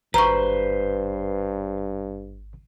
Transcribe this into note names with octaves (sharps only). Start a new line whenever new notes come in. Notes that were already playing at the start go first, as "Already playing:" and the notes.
G#1 G2 B4 C5 A#5 C#6